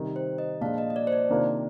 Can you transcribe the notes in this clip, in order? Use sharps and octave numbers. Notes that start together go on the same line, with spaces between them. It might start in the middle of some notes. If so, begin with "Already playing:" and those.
Already playing: C3 D#3 G3
C5
D#5
A#2 F3 G#3 D4 F5
D#5
D#5
D5
C5
D5
C3 D#3 A#3 D4 F4